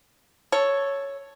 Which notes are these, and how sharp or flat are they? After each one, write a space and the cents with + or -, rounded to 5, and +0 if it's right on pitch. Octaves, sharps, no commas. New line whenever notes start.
A4 +0 C#5 +0